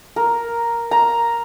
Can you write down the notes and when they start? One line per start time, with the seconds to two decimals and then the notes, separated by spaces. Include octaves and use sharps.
0.16 A#4
0.91 A#5